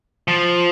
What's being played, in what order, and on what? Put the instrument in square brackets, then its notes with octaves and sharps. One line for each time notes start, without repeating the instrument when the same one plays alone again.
[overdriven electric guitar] F3